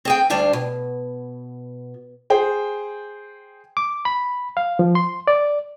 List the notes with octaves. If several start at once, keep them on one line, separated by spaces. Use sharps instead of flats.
C4 G#4 G5
D2 G3 D4 G4 F5
B2
G#4 C5 G5
D6
B5
F5
F3
C6
D5